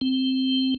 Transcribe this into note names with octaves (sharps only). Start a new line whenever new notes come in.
C4